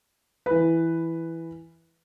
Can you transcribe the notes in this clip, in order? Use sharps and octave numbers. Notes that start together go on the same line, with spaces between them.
E3 B4